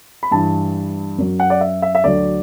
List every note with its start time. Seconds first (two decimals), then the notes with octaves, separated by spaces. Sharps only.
0.23 B5
0.31 G2 E3 A5
1.18 F#2 F#3
1.40 F#5
1.50 D5
1.61 E5
1.82 E5
1.95 E5
2.04 D2 D3 F#3 D5